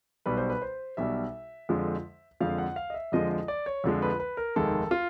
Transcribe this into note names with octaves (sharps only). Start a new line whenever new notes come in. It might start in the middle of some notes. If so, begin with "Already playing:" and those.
B1 B2 G3 B4
C5
B4
C5
B1 B2 G3 E5
F2 D3 F3 G#3
F2 D3 F3 G#3 F5
F#5
F5
D#5
E5
F2 D3 F3 G#3 D#5
D#5
D5
C#5
F2 D3 F3 G#3
B4
B4
A#4
F1 D#2 D#3 G#3 A4
F4